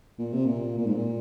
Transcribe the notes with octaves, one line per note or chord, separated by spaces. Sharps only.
A#2
C3
A#2
A#2
G#2
A#2